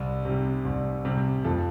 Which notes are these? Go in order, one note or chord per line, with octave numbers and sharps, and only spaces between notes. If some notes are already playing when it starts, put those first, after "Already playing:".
Already playing: C2
C3 G3
C2
C3 G3
F2 A4